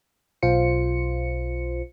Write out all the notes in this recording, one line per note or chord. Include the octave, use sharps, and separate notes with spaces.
B1 F4 C5 C#7